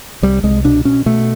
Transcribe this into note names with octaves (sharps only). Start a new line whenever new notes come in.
C2 G3
C2 G#3
B2 D4
B2 C#4
B2 A3